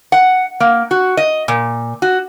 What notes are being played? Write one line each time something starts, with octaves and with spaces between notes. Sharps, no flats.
F#5
A#3
F#4
D#5
A#2
F#4